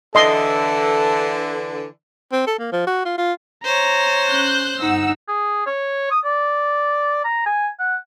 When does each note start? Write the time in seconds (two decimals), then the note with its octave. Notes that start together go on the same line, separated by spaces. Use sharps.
0.15 D3 E3 A4 D#5 C6
2.32 C4
2.47 A4
2.59 A#3
2.72 F3
2.87 F#4
3.05 F4
3.17 F4
3.65 C5 C#5 A#5
4.27 C#4 F#6 G6
4.80 G1 D#4 F#5 E6
5.28 G#4
5.66 C#5
6.10 D#6
6.25 D5
7.24 A#5
7.46 G#5
7.79 F#5